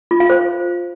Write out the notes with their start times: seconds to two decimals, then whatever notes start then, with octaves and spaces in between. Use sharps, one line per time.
0.11 F4
0.20 F5
0.30 C5